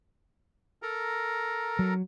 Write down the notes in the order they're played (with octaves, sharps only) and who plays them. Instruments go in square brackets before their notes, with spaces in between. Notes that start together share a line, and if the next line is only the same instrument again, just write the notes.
[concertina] A4 A#4 A#5
[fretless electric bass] F#3